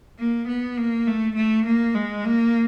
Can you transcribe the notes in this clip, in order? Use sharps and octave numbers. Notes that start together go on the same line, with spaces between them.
A#3
B3
A#3
A3
A3
A#3
G#3
A#3